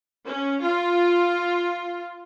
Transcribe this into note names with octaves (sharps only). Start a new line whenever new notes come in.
C#4
F4